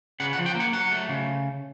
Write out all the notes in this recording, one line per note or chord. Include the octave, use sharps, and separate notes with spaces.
C#3 F#5
F#5
F3
G5
A#3
F#5
F#3 F#5
A3
C#3